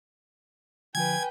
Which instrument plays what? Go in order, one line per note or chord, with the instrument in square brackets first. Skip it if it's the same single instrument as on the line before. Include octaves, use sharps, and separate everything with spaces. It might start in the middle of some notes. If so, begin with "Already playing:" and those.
[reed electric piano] D3 F3 [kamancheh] B4 G5 [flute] G#5 [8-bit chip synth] G#6